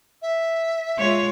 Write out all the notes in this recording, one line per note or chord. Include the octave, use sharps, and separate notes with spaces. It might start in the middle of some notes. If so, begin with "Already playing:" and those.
E5
G#3 F4 C#5